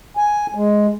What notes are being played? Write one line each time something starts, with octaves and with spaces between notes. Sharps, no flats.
G#5
G#3